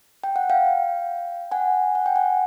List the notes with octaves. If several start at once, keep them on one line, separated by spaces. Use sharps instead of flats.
G5
F#5
F5 G5
F#5 G#5
F#5
G5
F#5 G#5